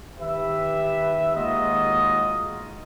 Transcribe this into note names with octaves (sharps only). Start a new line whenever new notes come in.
D#3 G4 B4 E5
D#2 G#3 D#4 F4 F#4 D#5